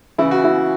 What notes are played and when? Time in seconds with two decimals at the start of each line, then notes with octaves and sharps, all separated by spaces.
0.18 C#3 E3 E4
0.31 F#4
0.44 E4